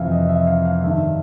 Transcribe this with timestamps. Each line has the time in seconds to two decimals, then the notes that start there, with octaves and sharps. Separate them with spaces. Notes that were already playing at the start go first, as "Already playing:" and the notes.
Already playing: F2 C3 E3 E5 F5
0.11 D#5
0.29 E5
0.47 F5
0.65 F5
0.83 G2 D#3 E5